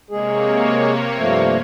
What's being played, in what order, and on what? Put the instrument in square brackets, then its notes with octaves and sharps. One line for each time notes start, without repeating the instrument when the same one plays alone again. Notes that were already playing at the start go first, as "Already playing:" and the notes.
[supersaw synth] C3 A#3 C#5 [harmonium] G#3 G#4
[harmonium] G2 F3 A3